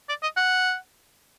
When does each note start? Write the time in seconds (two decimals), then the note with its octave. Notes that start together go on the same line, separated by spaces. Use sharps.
0.09 D5
0.23 D#5
0.37 F#5